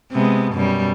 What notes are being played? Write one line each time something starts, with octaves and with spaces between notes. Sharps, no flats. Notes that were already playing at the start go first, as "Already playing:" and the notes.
C3 G#3 B3
F#2 B2 G3